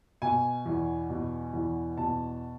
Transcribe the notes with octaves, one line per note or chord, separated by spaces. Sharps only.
B2 G#5
E2
B2
E2
B2 A5